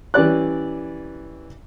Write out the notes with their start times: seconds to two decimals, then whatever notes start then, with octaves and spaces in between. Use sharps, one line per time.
0.14 E3 C#4 G4 D5 F#6